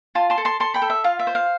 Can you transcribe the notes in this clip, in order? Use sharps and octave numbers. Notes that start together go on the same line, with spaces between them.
F4 A5 C6
A5 C6
A4
A5 C6
A4 A5 C6
G5 B5
A4
E5
F4 F5
E5
C5
F5